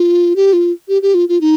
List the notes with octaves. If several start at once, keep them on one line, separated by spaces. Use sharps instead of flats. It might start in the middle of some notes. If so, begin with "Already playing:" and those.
Already playing: F4
G4
F4
G4
G4
F4
F4
D#4